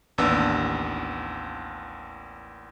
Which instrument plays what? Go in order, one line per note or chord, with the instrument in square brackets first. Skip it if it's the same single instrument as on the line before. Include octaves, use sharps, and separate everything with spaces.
[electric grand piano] A1 D#2 B3 D4 E6